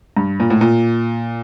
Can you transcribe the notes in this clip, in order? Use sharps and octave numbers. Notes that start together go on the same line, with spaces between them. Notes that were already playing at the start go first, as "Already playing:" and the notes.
G2
A#2
A2
A#2